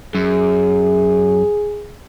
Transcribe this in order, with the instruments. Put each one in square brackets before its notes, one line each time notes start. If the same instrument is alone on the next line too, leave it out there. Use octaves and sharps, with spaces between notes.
[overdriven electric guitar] F#2 [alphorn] G#4